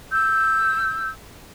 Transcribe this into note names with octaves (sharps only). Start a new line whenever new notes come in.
E6 G6